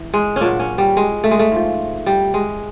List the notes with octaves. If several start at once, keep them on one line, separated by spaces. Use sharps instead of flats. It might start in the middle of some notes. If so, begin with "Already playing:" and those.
Already playing: E3
G#3
C#4
A#2 F#3 D4
C#4
G3
G#3
A3
G#3
A3
G#2 F3
G3
G#3